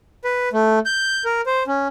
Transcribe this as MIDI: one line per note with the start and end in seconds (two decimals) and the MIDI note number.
0.24 0.49 71
0.53 0.79 57
0.86 1.24 91
1.25 1.41 70
1.46 1.63 72
1.67 1.88 61